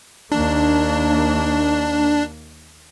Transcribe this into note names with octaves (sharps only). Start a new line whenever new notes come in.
D#2 A#3 D4